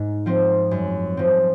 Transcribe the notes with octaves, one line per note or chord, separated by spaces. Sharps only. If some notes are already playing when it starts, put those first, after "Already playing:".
Already playing: G#2
F3 C4
F#2
F3 C4